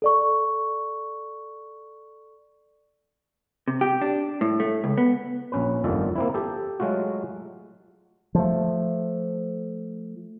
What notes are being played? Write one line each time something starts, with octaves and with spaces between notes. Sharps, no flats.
A4 D5 C#6
C3
G4
D4
A2
A3
C#2
B3
A#1 C#4 B4
G1 F2 D#3 D4 F4 A4
A#3 C4 E4
G4 A4
F#3 G#3 A3 F4 F#4
F3 A3